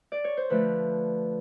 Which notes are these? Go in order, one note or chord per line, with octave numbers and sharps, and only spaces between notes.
D5
C#5
C5
D3 F3 A3 B4